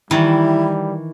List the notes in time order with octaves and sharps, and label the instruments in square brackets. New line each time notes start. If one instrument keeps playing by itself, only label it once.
[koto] D#3 E3 [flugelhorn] G3 [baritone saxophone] E4